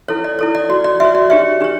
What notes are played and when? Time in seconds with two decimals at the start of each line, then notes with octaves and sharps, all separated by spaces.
0.08 E4 A4 C#5
0.24 D5
0.39 E4 A4 C#5
0.55 D5
0.70 F#4 D5
0.74 C#5
0.84 D5
1.00 F#4 E5
1.05 C#5
1.15 D5
1.30 D4 G4 C#5 E5
1.61 D4 G4 C#5